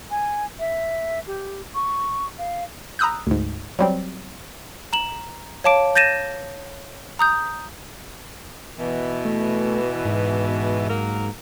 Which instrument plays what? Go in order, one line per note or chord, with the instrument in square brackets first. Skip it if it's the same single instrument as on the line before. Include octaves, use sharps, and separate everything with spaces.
[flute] G#5
E5
G4
C#6
F5
[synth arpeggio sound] A#5 B5 D#6 E6 F#6 G6
D2 G#2
F#3 G3 C4
[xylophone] A#5 E7 F#7
C#5 F5 A5 D6 D7
G6 A6 A#6 D#7 E7
A#5 D#6 G6
[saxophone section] B2 E3
[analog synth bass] A3
G#2
[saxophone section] F#3 A#3 A#4